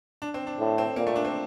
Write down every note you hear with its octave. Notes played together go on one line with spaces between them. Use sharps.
D4
C4
D4
A2
C4
A#2 A#3
A3
D4
C4